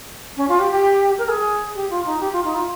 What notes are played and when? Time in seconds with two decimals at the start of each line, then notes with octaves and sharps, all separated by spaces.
0.37 C#4
0.48 F4
0.59 G4
0.71 G4
1.18 A#4
1.28 G#4
1.75 G4
1.90 F4
2.05 D#4
2.20 G4
2.32 F4
2.44 D#4
2.55 F4